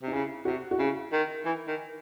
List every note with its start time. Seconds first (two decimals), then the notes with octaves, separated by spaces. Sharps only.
0.03 C3 D#4
0.12 C#3 E4
0.45 C3 F#4
0.71 F#4
0.79 C#3 E4
1.12 D#3
1.45 E3
1.68 D#3